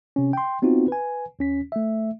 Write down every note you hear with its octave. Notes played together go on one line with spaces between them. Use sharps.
C3 C#4
G5 C6
B3 C4 D#4 F4 F#4
B4 G#5
D#2 C#4 B6
A3 E5